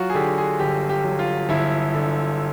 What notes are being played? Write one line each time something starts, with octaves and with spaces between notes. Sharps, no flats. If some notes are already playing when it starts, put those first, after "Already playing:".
Already playing: F#3 F4 F#4
G#4
D3 G4
G#4
G1 G4
G4
F#3
F4
G1 E4
D3